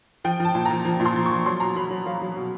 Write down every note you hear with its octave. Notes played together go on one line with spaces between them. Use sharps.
F3 G5
F3 A5
A#2
A#5
F3
F3
A#2
C6
F3
C#6
F3
F#3 C6
B2 A#5
F#3 B5
F#3
F#3 F5
F#3
B2